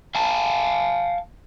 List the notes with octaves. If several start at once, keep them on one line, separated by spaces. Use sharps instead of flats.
F5 G#5 A5